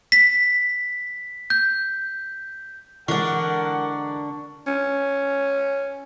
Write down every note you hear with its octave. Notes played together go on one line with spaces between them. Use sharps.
B6
G6
D3 E3 G#3 D4 A#4 F#5 C#6
C#4